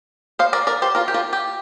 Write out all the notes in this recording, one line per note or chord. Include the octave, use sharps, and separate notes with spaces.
C5 F5
A#4 D5
A#4 D5
G4 C5
F4 A#4
G4
F4 A#4
G4